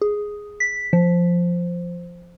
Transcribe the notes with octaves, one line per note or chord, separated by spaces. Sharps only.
G#4
B6
F3